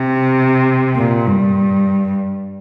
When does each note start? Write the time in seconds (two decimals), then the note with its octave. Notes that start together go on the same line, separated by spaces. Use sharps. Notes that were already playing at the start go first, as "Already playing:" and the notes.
Already playing: C3
0.96 A#2
1.26 G2